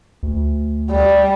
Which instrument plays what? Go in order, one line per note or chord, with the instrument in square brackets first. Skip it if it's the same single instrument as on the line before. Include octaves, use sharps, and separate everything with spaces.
[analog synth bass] D2
[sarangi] G3